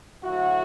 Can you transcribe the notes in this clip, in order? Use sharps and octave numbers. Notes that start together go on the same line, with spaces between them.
D3 F#3 A3 E4 F#4